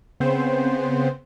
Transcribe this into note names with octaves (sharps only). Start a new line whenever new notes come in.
C#3 B3 C4 C5